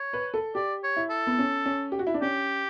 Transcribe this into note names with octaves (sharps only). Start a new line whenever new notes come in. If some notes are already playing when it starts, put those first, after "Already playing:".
Already playing: C#5
B4
A4
G4 D5
C#5
E4
A4
B3
C#4
C#4
G4
F#4
E4
D4
C#4 G4